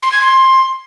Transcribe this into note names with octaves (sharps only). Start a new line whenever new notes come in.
C6
G#6
C6